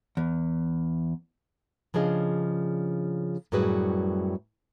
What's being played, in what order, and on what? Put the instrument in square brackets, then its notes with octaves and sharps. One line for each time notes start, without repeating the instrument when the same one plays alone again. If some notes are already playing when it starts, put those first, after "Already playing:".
[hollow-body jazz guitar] E2
[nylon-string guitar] C#3 F3 D4 G#4 D#5
F#2 A2 G3 F#4 G#4 B4